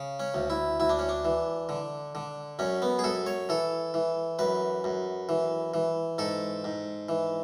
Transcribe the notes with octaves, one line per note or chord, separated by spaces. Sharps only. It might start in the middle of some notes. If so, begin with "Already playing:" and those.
Already playing: C#3
C#4
D2
E4
D2 E4
D4
C#4
D4
E3
D3
D3
F#2 C#4
B3
G#4
F#2 A4
C#5
E3 A4
E3
F#2 B4
F#2
E3
E3
G#2 A4
G#2
E3